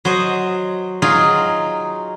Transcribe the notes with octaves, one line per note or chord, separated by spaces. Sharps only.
F#3 C5 D#5
F#3 D#4 F4 G#4